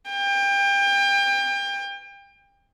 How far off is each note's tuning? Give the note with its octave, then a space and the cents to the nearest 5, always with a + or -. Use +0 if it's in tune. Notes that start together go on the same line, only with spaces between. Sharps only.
G5 +30